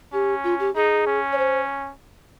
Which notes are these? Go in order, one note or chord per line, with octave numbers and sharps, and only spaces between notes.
C#4 G4
F4
G4
D#4 G#4
C#4
C#5
C5